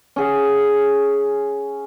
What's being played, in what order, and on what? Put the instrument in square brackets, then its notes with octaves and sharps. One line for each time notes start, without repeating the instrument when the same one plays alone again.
[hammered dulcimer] C#4 G#4 F#5